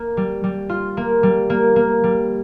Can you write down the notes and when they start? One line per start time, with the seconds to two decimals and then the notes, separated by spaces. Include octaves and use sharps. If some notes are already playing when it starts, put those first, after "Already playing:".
Already playing: A#3
0.17 G3
0.44 G3
0.69 F4
0.97 A#3
1.23 G3
1.50 A#3
1.76 A#3
2.04 G3